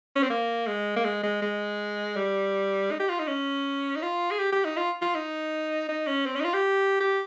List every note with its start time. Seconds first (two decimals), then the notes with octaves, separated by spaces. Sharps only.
0.16 C#4
0.23 C4
0.30 A#3
0.67 G#3
0.96 A#3
1.05 G#3
1.23 G#3
1.42 G#3
2.16 G3
2.91 D#4
3.00 G4
3.09 F4
3.19 D#4
3.28 C#4
3.96 D#4
4.02 F4
4.31 G#4
4.39 G4
4.52 G4
4.65 D#4
4.77 F4
5.01 F4
5.14 D#4
5.89 D#4
6.07 C#4
6.26 C4
6.35 C#4
6.40 D#4
6.44 F4
6.53 G4
7.00 G4